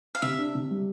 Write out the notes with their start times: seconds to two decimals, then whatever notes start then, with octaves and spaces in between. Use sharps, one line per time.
0.15 F5
0.22 C3 E5
0.38 D4
0.55 C3
0.71 G3